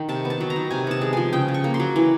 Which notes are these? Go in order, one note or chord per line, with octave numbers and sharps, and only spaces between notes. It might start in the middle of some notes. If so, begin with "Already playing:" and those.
Already playing: D#3
C3 A5
B3
A5
F#3
A#5
D#3
C3 G#5
B3 A5
G#3
F3 G#5
C#3 G5
C#3
C#6
A#3
C6
F#3
E3